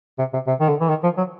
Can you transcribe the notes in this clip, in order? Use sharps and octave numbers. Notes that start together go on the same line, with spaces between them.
C3
C3
C3
D#3
D3
E3
D#3
F3
F#3